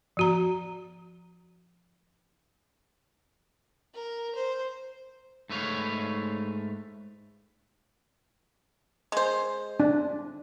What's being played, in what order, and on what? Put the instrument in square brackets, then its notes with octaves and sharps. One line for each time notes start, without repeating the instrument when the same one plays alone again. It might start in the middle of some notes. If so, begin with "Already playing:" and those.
[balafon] F3 F#4 A#5
[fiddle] A#4
C5
[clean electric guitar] G#2 A3 B4 C#5 F5
[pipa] G#3 C5
[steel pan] D4